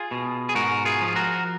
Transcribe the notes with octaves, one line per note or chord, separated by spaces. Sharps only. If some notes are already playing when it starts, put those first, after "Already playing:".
Already playing: F4 G#4
B2
G#4
G#2 F#4 A#4
F4 G#4
F3
F#4 A#4